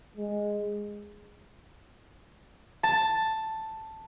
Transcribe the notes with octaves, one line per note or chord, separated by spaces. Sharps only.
G#3
A5